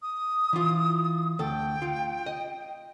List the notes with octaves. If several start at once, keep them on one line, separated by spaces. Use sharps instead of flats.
D#6
E3 F4
D2 A4 G5
F4
D#5